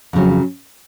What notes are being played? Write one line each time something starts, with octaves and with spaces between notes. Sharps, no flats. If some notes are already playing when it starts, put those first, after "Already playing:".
F2 C#3 F#3